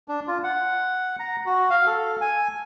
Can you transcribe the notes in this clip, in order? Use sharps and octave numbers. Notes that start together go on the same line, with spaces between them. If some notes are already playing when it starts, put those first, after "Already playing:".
D4
F4
F#5
A#5
F#4
F5
A4
G#5